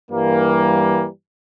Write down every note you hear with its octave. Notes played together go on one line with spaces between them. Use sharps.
G2 E3 G3 A#3